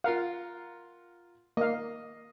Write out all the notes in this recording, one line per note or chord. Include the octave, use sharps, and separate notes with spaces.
F4 A#4 F5 F#5
A#3 D#5 F5